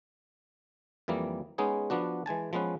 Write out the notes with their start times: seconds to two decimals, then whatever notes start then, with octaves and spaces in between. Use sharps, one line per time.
1.08 F2 E3 G3 A#3
1.58 G#3 B3 C#4 D#4 G#4
1.90 F3 B3 D4 F#4
2.26 E3 G#3 G#5 A5
2.53 F3 G#3 B3 C#4 B4